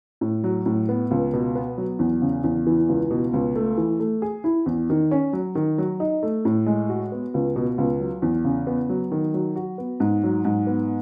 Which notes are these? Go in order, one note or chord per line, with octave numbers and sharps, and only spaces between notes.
A2
F#3
A2
B3
C#2
B2
B3
F#3
E2
C#3
E2
E3
C#2
B2
C#2
A3
E3
A3
G#4
E4
E2
D#3
C#4
F#3
D#3
F#3
D#4
A3
A2
G#3
F#4
B3
C#2
B2
C#2
F#3
E2
C#3
B3
F#3
D#3
F#3
F#4
B3
G#2
F#3
G#2
B3